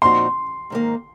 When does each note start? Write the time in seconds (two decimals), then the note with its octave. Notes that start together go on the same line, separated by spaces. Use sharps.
0.02 A#2 F3 C4 D#4 F#4 C6
0.70 G#2 D#3 A#3